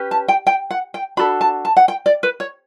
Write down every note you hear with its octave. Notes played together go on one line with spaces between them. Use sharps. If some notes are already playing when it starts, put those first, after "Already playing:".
Already playing: C#4 G4 B4
A5
G5
G5
F#5
G5
D4 F#4 A4 B5
A5
A5
F#5
G5
D5
B4
C#5